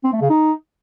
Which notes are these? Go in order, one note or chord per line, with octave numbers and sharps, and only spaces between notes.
C4
A3
C#3
D#4